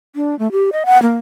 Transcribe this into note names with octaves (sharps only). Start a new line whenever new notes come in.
D4
A3
G4
D#5
F#5
A#3